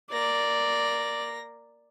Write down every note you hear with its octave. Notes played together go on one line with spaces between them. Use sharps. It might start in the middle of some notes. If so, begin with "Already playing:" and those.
A#3 D5 A#6